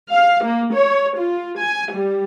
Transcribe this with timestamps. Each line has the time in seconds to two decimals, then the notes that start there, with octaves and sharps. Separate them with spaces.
0.11 F5
0.43 A#3
0.73 C#5
1.16 F4
1.58 G#5
1.91 G3